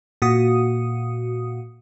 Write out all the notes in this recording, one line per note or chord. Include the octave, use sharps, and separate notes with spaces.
A#2 F#4 D#6